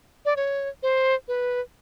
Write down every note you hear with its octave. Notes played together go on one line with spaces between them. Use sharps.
D5
C#5
C5
B4